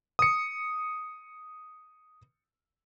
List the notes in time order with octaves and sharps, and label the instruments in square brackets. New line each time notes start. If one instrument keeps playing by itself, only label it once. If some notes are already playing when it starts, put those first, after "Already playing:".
[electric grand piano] D#6 C#7